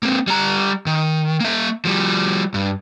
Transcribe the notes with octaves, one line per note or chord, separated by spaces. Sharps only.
A#3 C4
G3 A#5
D#3
A#3 E5
F3 G3
G2